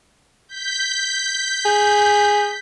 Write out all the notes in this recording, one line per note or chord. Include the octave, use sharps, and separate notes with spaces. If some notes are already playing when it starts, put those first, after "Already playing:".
G6 B6
G#4